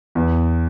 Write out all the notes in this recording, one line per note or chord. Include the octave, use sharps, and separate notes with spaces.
E2